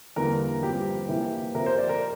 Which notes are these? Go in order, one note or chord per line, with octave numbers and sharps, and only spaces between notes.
E2 D3 G3 A#3 A#4
G2 F3 C4 G4
C3 E3 A#3
C3 F3 C4 A#4
C5
D5
A#4